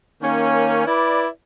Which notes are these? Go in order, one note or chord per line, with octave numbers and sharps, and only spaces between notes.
D#3 A#3 C#4
E4 B4 D5